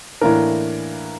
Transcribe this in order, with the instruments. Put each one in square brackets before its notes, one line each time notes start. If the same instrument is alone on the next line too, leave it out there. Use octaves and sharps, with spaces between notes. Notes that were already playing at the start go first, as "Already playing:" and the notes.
[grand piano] A2 E3 A#3 D4 A#4